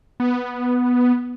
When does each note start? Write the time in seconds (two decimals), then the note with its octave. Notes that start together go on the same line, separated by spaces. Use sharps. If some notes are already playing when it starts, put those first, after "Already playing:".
0.20 B3